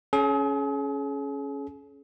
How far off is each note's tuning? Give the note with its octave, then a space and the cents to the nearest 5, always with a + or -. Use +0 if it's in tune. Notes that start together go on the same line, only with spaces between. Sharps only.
C#4 +0 G#4 +40